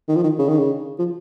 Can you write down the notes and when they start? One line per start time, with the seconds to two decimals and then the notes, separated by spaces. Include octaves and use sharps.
0.08 D#3
0.16 F3
0.23 D#3
0.38 C#3
0.48 D#3
0.58 C#3
0.99 F3